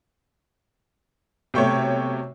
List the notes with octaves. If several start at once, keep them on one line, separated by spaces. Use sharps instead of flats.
B1 C3 A3 C#5 G5 C#6